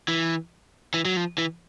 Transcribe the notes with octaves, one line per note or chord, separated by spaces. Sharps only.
E3
E3
F#3
F3
E3